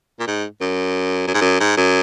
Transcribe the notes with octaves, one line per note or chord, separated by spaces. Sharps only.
A#2
G#2
F#2
F#2
G#2
F#2
G#2
F#2